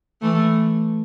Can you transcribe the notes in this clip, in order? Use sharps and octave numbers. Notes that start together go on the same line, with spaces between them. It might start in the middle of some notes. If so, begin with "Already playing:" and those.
E3 A3